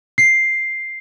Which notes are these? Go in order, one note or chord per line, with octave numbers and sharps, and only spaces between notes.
C7